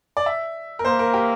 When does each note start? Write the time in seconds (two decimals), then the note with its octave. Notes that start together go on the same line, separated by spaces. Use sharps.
0.17 D5
0.26 E5
0.79 A#4
0.84 A#3 C5
0.99 A#4
1.14 G4